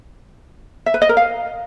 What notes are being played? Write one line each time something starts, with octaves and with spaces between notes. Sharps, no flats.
E5
B4
D#5
A#4
F5